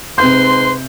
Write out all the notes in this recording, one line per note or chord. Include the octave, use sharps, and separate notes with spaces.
G#2 C3 B4 C6 G6